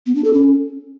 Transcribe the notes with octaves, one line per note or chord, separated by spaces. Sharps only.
B3
D4
A4
C#4